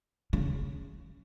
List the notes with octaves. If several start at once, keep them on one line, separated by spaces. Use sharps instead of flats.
C#3